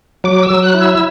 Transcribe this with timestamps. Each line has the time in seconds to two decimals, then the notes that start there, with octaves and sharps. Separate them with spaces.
0.24 F#3 D6
0.43 E6
0.50 F#3
0.63 F#6
0.74 E4
0.81 E6